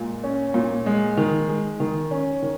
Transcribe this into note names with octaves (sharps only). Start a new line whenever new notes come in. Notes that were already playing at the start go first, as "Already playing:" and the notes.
Already playing: A#2 G#3
C#4
A#2
G#3
D#3
G#3
D#3
C#4
D#3